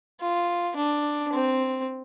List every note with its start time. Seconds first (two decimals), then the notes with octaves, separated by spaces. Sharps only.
0.21 F4
0.76 D4
1.33 C4